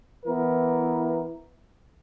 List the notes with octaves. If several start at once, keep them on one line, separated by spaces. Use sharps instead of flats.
E3 B3 E4 A#4